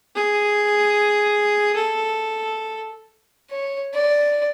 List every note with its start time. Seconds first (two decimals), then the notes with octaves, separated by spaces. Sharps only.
0.16 G#4
1.76 A4
3.51 C#5
3.94 D5